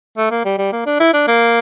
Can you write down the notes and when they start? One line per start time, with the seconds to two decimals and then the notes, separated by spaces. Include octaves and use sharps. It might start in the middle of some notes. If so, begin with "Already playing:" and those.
0.18 A3
0.31 A#3
0.45 G3
0.58 G3
0.72 A#3
0.86 D4
1.00 E4
1.13 D4
1.28 A#3